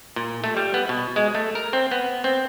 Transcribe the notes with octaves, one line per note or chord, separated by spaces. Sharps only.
A#2
A3
G3
B3
B2
G#3
A3
A#4
C4
B3
C4